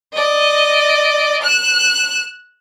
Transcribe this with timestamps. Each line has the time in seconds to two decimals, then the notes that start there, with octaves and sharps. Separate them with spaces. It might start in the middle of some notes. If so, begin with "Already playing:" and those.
0.14 D5 D#5
1.42 F#6 E7